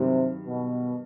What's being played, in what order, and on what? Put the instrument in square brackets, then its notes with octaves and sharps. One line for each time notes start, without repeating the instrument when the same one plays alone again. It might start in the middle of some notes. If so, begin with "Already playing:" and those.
Already playing: [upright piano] G2 D#3 F#3 [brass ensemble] C3
[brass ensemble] B2